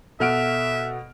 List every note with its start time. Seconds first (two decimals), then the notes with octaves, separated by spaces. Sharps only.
0.20 B2 A4 E5 F#5 F6 D7